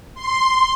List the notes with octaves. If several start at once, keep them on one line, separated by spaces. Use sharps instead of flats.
C6